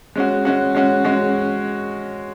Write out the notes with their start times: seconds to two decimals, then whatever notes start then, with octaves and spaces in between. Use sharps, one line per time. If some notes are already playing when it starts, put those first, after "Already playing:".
0.16 G#3 C#4 F#4
0.45 G#3 C#4 F#4
0.75 G#3 C#4 F#4
1.05 G#3 C#4 F#4